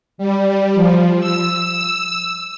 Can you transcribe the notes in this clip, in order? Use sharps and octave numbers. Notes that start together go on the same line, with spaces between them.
G3
F3
E6